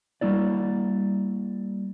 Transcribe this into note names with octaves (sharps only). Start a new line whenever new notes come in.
G3 A#3 E4 D5